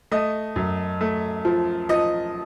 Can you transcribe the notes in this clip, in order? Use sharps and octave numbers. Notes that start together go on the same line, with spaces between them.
A3 D#5
F#2
A3
F3
F3 D#5